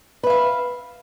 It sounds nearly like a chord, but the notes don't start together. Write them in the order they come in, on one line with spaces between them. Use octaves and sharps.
B4 E5 F5